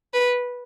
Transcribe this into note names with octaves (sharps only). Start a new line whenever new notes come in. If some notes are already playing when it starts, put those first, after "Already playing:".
B4